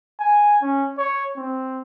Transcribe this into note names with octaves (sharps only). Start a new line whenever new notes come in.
G#5
C#4
C#5
C4